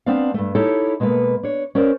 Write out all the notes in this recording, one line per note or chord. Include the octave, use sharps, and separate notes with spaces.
B3 C4 D4 D5 F5
G2 A3
D#4 E4 G4 A4 C#5
B2 G#3 A#3 A4 B4
D4 C#5
C#4 A#4 C5 D5